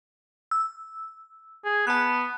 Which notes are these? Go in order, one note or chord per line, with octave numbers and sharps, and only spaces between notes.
E6
G#4
B3 A5 F#6